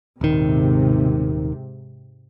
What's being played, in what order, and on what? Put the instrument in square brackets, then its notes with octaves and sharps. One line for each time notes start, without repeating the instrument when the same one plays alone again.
[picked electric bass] D#1 D#3 [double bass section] G#2 C3